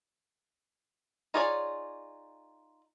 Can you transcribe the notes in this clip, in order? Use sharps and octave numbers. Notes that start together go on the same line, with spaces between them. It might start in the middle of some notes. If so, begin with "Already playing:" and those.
D#4 F4 G#4 C#5 D5